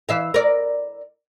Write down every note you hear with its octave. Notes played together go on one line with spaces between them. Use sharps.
E3 E5 F5
A#4 D5